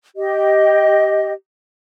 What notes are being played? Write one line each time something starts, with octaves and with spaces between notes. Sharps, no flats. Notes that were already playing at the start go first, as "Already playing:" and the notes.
G4 D#5